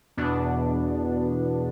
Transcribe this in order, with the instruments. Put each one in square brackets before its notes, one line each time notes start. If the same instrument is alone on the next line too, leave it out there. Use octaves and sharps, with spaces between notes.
[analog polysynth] E2 B2 B3 D4